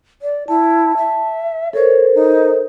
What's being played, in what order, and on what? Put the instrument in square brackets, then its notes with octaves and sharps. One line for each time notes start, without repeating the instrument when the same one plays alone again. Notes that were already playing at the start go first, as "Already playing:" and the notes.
[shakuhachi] D5
[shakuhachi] E4 [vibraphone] A5
[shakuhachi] E5
[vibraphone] A4 A#4 C5 [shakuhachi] C#5
[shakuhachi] D#4